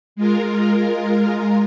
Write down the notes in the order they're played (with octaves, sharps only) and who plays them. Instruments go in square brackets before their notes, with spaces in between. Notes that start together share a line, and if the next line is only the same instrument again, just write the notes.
[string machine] G#3 F4 A#4